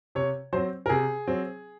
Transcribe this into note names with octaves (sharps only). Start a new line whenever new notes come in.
C3 C#5
F#3 C4 C5
A#4
C3 G#4
F#3 C4